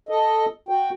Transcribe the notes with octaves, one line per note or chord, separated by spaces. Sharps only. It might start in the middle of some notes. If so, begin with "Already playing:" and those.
A4 D#5
F#4 G5